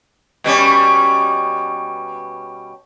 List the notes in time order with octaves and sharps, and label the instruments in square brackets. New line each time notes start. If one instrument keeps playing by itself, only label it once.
[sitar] B2 G3 C#4